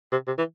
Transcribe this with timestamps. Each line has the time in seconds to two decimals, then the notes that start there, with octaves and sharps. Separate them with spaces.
0.12 C3
0.28 C3
0.38 E3